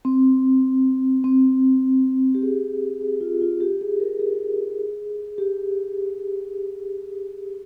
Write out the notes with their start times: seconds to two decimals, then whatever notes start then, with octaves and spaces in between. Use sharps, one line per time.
0.05 C4
1.24 C4
2.35 G4
2.42 G#4
3.01 G#4
3.21 F4
3.41 F4
3.60 G4
3.81 G#4
4.00 A#4
4.19 G#4
5.38 G4